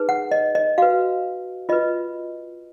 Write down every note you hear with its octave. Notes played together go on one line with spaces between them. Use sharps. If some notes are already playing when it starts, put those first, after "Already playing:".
Already playing: D#4 G#4 B4
F#5
D#5
D#5
F#4 B4 F5
F4 B4 D#5